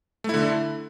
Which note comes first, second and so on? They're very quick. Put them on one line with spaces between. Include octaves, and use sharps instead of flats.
A3 E4 D3